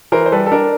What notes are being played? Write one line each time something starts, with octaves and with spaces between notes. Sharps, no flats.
E3 A#4 C5
C5
G3 A4 B4
A4
D4 A#4